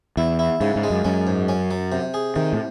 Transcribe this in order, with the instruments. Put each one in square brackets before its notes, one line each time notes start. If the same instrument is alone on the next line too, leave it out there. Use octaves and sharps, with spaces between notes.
[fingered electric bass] E2 [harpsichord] E4
[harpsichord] E4
[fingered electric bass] G#2 [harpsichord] C#3
[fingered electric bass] G#2
[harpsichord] G#3
[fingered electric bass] F#2
[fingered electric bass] F#2 [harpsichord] C#4
[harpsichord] G#2
C#4
F#3
C3
G#4
[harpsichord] C3 [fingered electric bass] D#3
[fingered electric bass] A2